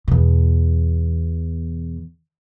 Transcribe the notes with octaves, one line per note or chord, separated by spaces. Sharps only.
E2 B2